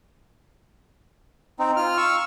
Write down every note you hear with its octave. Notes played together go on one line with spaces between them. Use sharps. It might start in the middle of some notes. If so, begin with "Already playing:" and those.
C4 D#4
F4 F6
F5 C#6 E6